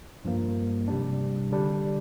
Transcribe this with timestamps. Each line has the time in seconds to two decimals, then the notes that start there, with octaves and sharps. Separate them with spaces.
0.25 G2 F3 A#3
0.88 C3 G3 D4
1.51 D3 G3 D4